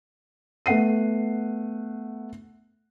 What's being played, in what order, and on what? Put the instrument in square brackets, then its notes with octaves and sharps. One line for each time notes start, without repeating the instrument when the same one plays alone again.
[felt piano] A3 B3 F#5 C7 D#7